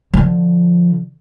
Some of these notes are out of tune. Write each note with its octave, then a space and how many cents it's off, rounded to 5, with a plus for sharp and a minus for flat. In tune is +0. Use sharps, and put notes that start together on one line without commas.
D3 +5 F3 +0